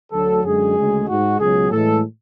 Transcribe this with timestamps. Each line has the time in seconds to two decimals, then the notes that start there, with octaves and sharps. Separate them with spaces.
0.12 D2 D3 F#3 A4
0.44 F#2 D3 G#3 G#4
0.76 D2 C#3 G#3
1.08 G#2 G#3 F#4
1.40 C#2 B2 F#3 G#4
1.71 A2 E3 G#3 A4